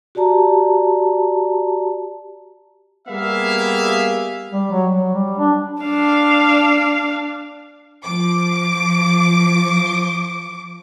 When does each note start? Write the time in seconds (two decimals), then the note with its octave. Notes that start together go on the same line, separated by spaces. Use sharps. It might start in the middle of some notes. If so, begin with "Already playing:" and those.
0.15 F#4 G4 D5 A5 A#5
3.08 G3 A#3 B3 G#4 E5 F5
4.51 G3
4.71 F#3
4.93 F#3
5.14 G3
5.39 D4
5.82 D4 F5
8.05 F3 D6